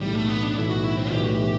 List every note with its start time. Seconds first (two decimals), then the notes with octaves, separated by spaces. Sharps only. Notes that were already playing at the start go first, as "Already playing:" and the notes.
0.01 B1 A2 E3 G3
0.15 A3
0.28 B3
0.43 D4
0.56 B1 A2 E3 E4
0.69 F#4
0.84 E4
0.97 C4
1.11 B1 A2 E3 G4
1.24 F#4
1.35 G4